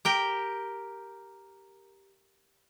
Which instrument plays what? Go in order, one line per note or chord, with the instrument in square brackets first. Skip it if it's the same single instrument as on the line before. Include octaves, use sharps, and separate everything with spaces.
[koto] G4 A#4 G5